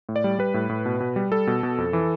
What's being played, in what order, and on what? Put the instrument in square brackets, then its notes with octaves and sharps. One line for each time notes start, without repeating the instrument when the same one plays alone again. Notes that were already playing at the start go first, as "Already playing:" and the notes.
[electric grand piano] A2
D5
G3
G3 B4
A2
A2
B2
B2
G3
G3 A4
B2
B2
F2
E3